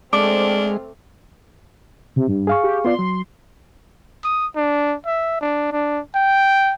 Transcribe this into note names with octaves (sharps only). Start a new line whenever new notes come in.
G#3 A3 C4 D4 D6 F6
C3
G2
G#4 F5 C#6
G4
B3 F4 D5 C6
F#3
D#6
D4
E5
D4
D4
G5